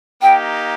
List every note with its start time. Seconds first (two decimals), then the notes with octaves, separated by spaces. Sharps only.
0.22 A#3 D#4 G4 G5